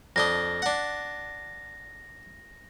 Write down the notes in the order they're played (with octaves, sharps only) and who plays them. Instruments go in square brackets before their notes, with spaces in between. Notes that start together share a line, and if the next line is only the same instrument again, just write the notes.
[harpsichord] F2 D4 D#5 [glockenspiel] A#6
[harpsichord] D4 F#5